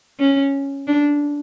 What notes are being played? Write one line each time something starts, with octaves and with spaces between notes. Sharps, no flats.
C#4
D4